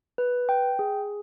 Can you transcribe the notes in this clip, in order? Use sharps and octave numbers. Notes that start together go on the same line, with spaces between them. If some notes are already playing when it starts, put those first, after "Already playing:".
B4
G5
G#4